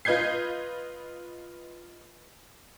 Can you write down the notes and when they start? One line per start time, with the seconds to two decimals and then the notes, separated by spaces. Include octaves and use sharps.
0.05 F4 B4 D#5 G6 G#6 C7